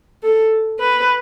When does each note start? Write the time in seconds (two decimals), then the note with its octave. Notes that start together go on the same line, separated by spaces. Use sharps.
0.23 A4
0.80 B4